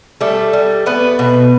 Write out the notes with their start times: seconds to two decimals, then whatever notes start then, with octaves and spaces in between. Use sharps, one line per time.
0.20 G3 A3 A4
0.53 G3
0.86 A3 B3 B4
1.19 B2